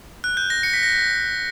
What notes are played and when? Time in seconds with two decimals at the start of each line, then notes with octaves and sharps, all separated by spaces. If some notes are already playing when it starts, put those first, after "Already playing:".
0.24 F#6
0.37 G6
0.50 A#6
0.63 C#7
0.74 B6
0.83 A#6
0.93 B6